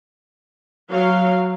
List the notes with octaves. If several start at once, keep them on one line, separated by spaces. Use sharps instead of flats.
F#3 F5